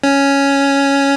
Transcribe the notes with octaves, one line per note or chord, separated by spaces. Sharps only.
C#4